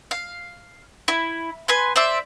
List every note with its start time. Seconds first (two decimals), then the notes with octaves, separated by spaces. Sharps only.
0.11 F5
1.08 E4
1.68 B4 G#5 C6
1.96 C5 D5 E5